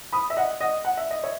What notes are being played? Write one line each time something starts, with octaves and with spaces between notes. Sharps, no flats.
B5 D#6
E5
D#5 F#5
D#5 F#5
F#5
E5
D#5
C#5 E5